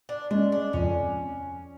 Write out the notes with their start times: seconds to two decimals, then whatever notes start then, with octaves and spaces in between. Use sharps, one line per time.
0.09 D4
0.31 G#3 C#4 D4
0.52 D4
0.73 F2 C#4